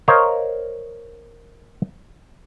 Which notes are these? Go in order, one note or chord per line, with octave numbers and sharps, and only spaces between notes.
A#4 C5 C#5 D#5 F5